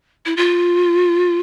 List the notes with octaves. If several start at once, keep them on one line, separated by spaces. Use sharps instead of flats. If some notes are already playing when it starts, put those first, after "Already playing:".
E4
F4